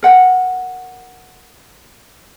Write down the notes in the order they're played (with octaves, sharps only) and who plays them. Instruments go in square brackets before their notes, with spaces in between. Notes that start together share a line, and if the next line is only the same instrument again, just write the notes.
[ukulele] A#4 F#5 G5